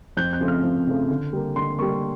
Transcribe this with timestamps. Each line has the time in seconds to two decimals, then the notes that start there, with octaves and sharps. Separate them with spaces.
0.17 F2 G6
0.33 G6
0.40 C#3 F3 A3
0.48 F6
0.63 F2
0.87 C#3 F3 A3
1.10 D3
1.33 G3 A#3
1.56 D3 C6
1.78 G3 A#3 C#6